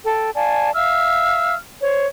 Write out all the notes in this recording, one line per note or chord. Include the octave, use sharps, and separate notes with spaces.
A4 G5
D5 F5 G#5 A5
E5 F5 E6 F6
C5 C#5